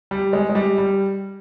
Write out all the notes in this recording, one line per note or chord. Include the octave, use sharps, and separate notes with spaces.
G3
G#3
G#3
G3
G3